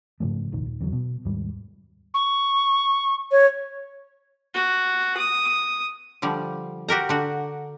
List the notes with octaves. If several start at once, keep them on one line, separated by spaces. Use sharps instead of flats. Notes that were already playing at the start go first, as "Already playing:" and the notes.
G#2 C#3 F3 A3
F1 A#1 D#3
D#1
E2 D3 F#3
B2
D#2 G#2 G3
C#6
C#5
F#4
D#6
D3 F3 G3
F#4 G4 A#4 A#5
D3 F#4